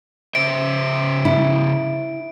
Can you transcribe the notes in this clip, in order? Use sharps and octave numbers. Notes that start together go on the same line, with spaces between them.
C#3 C5 E5 D7
E4